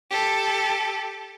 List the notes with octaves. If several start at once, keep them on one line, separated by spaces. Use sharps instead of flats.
G4 A4